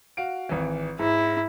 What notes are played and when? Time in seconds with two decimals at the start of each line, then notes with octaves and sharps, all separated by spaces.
0.17 F#4 F5 D7
0.49 G#1 E3
0.99 G#2 E4